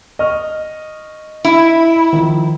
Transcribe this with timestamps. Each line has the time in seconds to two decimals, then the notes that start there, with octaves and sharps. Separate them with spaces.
0.19 D#5 C#6 F6
1.45 E4
2.13 D#3 F3